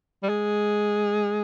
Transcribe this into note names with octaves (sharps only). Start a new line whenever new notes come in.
G3
G#3